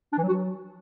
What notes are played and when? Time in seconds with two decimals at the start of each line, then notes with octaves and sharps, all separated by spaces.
0.13 D4
0.18 E3
0.23 F#3
0.28 F#4
0.33 F#3